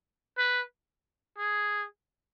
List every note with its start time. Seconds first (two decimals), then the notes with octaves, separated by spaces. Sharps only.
0.38 B4
1.38 G#4